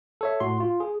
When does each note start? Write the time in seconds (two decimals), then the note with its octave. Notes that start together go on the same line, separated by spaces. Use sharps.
0.21 A4 C#5 E5
0.40 A2 F#4 C6
0.60 F4
0.80 G#4